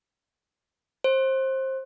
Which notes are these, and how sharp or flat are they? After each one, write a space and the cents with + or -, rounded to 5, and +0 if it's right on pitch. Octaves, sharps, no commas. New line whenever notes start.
C5 +20